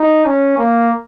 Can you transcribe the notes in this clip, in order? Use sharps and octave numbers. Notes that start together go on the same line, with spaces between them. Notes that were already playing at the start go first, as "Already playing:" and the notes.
Already playing: D#4
C#4
A#3